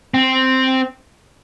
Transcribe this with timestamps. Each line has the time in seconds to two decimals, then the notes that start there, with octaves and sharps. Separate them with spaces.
0.14 C4